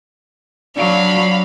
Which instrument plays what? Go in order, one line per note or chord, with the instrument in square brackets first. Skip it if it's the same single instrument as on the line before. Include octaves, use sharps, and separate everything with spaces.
[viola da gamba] F#3 [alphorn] D4 [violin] F5 B5